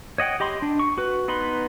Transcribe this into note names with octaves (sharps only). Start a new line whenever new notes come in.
C#5 D#5 F#5 G5
G4 D#5 B5 C6
D4
C#6
F#4 B4
B3 D#4 B4 B5 C6